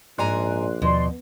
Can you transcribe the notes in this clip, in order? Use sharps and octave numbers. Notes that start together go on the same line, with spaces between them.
A#1 G#2 D5 G#5 A#5 C6 F#6
D#2 B2 F3 D5 C6